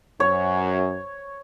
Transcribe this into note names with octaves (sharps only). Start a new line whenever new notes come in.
F#2 C#5